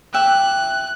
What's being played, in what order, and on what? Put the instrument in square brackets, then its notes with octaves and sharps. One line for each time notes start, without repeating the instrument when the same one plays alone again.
[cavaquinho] E5 G5 D6 [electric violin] F#6